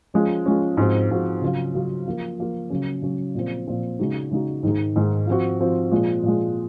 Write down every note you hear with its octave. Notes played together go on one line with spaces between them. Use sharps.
F3 G#3 C#4
F3 G#3 C#4
G#2 F3 C4 F#4
G#2 F3 C4 F#4
C#3 F#3 C#4 F4
C#3 F#3 C#4 F4
F3 A#3 F4
F3 A#3 F4
C#3 F#3 C#4
C#3 F#3 C#4
A#2 F3 C4
A#2 F3 C4
C#3 G#3 D#4 F#4
C#3 G#3 D#4 F#4
G#2 D#3 G#3 D#4
G#2 D#3 G#3 D#4
F3 C4 F#4
F3 C4 F#4
A#2 F3 G#3
A#2 F3 G#3